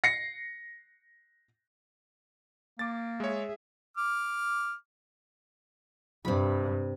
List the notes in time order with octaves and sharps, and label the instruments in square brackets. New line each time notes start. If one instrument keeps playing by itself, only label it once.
[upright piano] A#6 C7 C#7
[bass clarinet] A#3 [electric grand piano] D6 A6
[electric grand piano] G#3 C#5 [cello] G#4 E5
[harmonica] D6 F6
[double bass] G2 [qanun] C3 B5